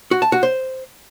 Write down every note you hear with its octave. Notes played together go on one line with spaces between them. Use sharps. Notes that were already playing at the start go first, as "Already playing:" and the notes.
F#4
A5
F#4
C5